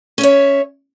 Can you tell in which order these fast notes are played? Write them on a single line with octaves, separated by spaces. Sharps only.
C#4 E5 C#5